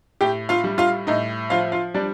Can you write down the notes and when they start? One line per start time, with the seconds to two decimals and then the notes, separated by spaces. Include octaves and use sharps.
0.21 A2 G4 G5
0.49 F4 F5
0.64 G3
0.78 F4 F5
1.07 A2 D#4 D#5
1.50 F3 F4 F5
1.72 F4 F5
1.94 G3 D4 D5